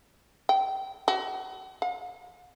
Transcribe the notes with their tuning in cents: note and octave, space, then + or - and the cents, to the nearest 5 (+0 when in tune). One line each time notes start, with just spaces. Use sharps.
G5 -25
F#4 +40
F5 +45